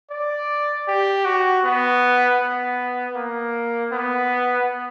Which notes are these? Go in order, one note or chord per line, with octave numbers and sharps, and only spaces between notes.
D5
G4
F#4
B3
B3
A#3
B3